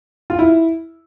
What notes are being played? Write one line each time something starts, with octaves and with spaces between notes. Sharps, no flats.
F4
E4